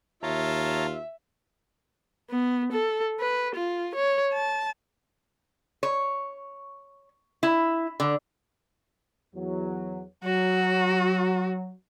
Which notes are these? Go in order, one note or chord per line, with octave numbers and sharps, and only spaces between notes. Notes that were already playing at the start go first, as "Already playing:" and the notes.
D#2 F4 C#5 E5 A5 A#5
B3
A4
B4
F4
C#5
A5
C#5
E4
D3
E2 F#3
F#3 F#4